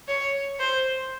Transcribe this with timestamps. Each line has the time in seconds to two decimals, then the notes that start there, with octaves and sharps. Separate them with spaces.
0.08 C#5
0.59 C5